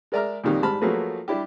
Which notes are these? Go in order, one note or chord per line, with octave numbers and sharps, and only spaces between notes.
G#3 A#4 D5 E5 A#5 F6
F2 A#2 D#3 G3
G#2 G3 A5 B5 F6
F3 F#3 A3 A#3 G#4 B4
G3 D4 E4 G4